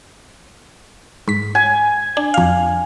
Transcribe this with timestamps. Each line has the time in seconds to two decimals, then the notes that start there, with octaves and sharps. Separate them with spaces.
1.28 G#2 B6
1.55 G#5
2.17 D4
2.34 F2 F5